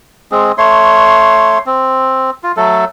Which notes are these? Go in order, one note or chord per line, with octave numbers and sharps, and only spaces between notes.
G#3 C4 G#4
A3 C#5 C6
C4
F4
F#3 A3 A4